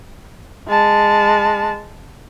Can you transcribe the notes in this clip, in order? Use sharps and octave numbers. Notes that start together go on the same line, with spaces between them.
G#3 A5